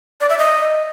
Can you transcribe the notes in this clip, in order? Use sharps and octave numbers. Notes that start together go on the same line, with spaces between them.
D5
E5
D#5